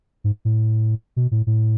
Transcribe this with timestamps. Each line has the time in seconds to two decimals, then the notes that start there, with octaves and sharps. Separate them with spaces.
0.24 G#2
0.45 A2
1.16 B2
1.31 A2
1.47 A2